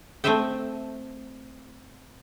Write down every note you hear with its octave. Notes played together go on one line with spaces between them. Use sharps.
A3 C4 C5 D#5 E5 G5